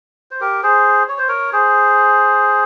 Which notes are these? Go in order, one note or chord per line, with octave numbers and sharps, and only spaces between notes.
C5
G4 A#4
G#4 C5
C#5
C5
A#4 C#5
G#4 C5